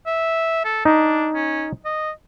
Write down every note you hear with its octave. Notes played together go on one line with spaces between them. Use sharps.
E5
A4
D4 D#4
C#4
D#5